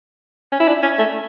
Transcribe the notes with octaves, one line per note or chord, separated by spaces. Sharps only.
C#4
E4
D4
C#4
A3